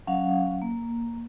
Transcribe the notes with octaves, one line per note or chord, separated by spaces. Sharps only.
F#3 C#4 F5 F#5
A#3